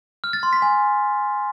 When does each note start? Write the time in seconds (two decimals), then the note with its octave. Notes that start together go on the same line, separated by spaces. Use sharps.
0.24 F6
0.33 A6
0.43 C6
0.53 B6
0.62 G#5